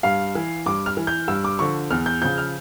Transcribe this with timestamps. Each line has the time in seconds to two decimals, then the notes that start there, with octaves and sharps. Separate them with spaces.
0.03 G2 F5
0.35 E3
0.66 G2 D6
0.86 F6
0.97 E3
1.07 G6
1.28 G2 E6
1.45 D6
1.59 D3 F3 C#6
1.91 E2 F6
2.06 G6
2.22 C#3 F3 G6
2.38 F6